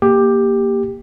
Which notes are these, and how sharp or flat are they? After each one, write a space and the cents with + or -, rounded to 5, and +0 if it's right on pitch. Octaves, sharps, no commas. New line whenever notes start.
A#3 +0 G4 +10